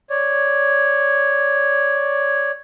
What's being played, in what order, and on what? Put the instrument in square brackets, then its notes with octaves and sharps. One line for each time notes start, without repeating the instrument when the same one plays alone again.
[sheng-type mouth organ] C#5 D5